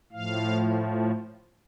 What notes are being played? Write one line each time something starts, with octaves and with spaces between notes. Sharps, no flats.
A2 F3 F5